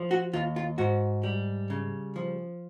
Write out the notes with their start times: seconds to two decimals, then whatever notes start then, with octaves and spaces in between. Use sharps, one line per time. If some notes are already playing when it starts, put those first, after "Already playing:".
Already playing: F3
0.11 F#4
0.33 D#2 F4
0.56 F4
0.78 G#2 F#4
1.23 G3
1.70 C#3
2.16 F3